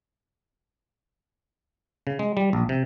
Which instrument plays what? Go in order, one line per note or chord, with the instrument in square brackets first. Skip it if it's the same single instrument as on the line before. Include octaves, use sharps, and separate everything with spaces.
[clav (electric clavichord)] C#3
G#3
G3
A#1
C3